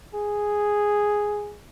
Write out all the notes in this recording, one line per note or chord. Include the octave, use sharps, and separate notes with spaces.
G#4